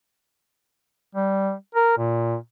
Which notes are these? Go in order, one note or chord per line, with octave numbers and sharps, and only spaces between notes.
G3
A#4
A#2